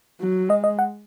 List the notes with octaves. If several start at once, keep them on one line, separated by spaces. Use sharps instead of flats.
F#3
G#3 D#5
D#5
F#5